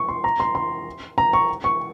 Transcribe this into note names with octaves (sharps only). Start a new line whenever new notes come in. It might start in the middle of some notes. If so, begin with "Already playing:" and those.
Already playing: C#6
C6
A#5
C6
C6
A#5
C#6
C#6